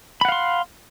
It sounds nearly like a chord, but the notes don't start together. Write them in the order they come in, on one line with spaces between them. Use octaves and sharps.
B5 F#5 F5 C6